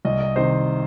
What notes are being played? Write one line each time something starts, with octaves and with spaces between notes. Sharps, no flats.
C2 D#5
D#5
C3 D#3 C5